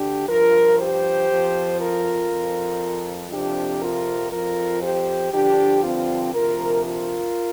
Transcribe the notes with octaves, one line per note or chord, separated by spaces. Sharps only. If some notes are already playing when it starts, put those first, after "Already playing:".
Already playing: D2 D3 D4 G4
G2 F3 F4 A#4
G4 C5
F2 F3
F4 A#4
F2 F3
F2 C3 F3 D4 G4
F4 A#4
F2 F3 F4 A#4
G4 C5
G2 D3 F3 D4 G4
C4 F4
D2 C3 F3 F4 A#4
F4 A#4